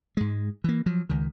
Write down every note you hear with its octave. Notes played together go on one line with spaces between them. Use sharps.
G#2 G#3
E3 A#3
F3 F#3
C#2 D#3